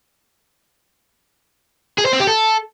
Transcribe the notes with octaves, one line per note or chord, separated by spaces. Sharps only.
G#4
C5
C4
G4
A4